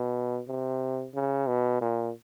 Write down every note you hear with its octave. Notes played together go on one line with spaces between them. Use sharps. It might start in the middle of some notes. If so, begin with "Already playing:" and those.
Already playing: B2
C3
C#3
B2
A#2